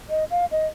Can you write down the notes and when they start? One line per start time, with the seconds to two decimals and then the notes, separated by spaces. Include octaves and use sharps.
0.10 D#5
0.31 F5
0.51 D#5